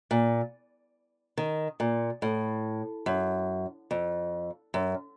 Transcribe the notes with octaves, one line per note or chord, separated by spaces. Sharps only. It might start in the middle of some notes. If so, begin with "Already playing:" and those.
A#2
D#3
A#2
A2
F#2
F2
F#2